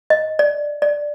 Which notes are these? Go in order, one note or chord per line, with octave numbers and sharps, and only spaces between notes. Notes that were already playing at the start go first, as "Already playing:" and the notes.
D#5
D5
D5